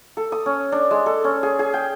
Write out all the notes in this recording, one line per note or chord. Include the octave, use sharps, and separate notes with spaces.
A4
D#6
C#4
D4
G#3
A4
C#4
G#4
G#4
G5